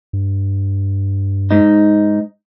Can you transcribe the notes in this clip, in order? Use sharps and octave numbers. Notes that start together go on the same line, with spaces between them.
G2
G#2 D#4